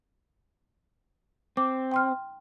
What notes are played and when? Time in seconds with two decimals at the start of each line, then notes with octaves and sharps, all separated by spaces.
1.57 C4 D6
1.91 G5 C6 F6